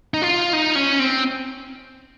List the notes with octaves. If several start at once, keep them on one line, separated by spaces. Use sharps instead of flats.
D#4
F4
D#4
C#4
C4